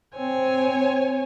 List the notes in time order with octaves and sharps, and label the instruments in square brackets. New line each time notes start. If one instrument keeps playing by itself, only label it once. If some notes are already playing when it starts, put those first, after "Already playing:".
[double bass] C4 [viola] C#5 G#5